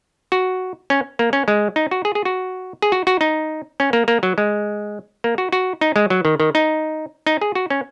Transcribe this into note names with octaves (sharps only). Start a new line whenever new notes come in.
F#4
C#4
A#3
C#4
G#3
D#4
F#4
G#4
G#4
F#4
G#4
F#4
F#4
D#4
C#4
A#3
A#3
F#3
G#3
A#3
F#4
F#4
D#4
G#3
F#3
D#3
D#3
D#4
D#4
G#4
F#4
C#4